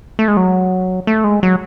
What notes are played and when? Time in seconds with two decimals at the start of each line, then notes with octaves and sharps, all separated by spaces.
0.19 A3
0.28 G#3
0.37 F#3
1.07 A3
1.24 G#3
1.43 F#3